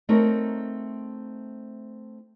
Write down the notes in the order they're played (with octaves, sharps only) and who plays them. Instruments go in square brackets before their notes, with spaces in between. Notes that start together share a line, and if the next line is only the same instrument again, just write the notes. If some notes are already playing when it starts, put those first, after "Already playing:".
[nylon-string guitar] A3 C4 D#4 A#4 C#5